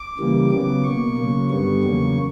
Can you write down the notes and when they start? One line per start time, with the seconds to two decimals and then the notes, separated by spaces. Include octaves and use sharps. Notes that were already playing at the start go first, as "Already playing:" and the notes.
Already playing: D6
0.18 C#3 E3 G3 A#3
0.51 C#3 F#3 B3 D6
0.84 B2 A#3 C#6
1.17 C#3 F#3 A#3
1.50 G2 D3 G3 B3 C#6
1.83 E2 C#3 F#3 A#3